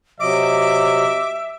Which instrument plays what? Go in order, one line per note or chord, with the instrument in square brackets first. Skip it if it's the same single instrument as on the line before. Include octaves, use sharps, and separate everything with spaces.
[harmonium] C3 F#3 D#5 [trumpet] E5 [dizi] D6